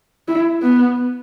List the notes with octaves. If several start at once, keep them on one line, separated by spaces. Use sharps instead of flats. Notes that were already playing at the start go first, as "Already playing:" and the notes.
E4
B3